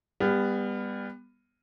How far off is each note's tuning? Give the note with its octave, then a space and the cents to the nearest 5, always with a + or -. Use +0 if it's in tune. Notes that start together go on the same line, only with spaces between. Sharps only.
G3 +30 B3 +0